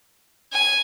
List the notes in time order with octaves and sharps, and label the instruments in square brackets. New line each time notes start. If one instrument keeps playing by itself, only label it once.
[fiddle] G#5